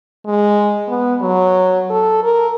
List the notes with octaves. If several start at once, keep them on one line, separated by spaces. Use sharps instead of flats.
G#3
B3
F#3
A4
A#4